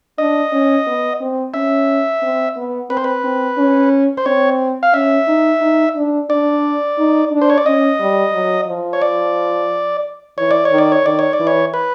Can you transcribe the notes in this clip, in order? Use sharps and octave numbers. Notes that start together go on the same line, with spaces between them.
D4 D#5
C#4
B3
C4
C#4 E5
C4
B3
C4 B4
C5
B4
C4
C#4
C5
C4 C#5
F5
C#4 E5
D#4
D#4
D4
D4 D5
D#4
D4
C5
C#5
D5
C#4 D#5
G3
F#3
F3
C#5
D5
E3 C#5
D5
C#5
D#3
D5
C#5
D#3 D5
C#5
D5
E3
C#5
B4